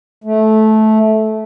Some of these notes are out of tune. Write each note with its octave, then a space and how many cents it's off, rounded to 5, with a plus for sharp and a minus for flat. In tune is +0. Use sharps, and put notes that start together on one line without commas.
A3 -15